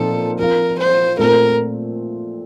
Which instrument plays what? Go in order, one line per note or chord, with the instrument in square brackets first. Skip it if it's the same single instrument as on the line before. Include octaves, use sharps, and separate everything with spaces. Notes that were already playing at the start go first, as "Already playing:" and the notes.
Already playing: [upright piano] A#2 F3 C4 D#4 [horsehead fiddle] A4
[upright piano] F3 C4 F4 [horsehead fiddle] A#4
[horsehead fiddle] C5
[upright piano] A#2 A3 C4 [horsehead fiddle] A#4